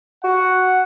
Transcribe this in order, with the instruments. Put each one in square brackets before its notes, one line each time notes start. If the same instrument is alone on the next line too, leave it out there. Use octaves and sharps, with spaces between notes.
[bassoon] F#4 [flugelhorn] F#5